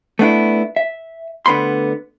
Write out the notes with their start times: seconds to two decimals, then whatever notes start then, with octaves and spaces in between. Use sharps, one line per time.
0.19 A3 B3 D4 E4
0.76 E5
1.46 D2 D3 B3 B5 C6